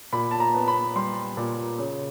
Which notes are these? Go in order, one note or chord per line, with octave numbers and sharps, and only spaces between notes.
A#2 B5
A5
A#5
B3
B5
G3 C6
A#2
C#3